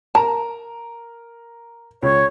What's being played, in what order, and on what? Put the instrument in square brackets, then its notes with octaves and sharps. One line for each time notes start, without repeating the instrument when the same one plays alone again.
[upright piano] A#4 A#5 [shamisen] A5
[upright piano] C#2 [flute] C#5